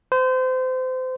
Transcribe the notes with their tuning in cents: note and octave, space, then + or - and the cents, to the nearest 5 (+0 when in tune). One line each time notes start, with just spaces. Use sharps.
C5 -30